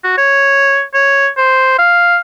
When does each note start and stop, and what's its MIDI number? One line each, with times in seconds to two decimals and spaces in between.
0.04 0.16 66
0.17 0.82 73
0.93 1.28 73
1.37 1.77 72
1.78 2.18 77